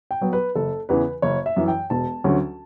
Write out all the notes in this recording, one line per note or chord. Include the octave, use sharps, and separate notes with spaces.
G5
F#3 B3
B4
F#1 A4
E2 C#3 E3 B4
F#1 C#5
E5
F#2 E3
G5
E1 A5
D2 D3 F#3 C#4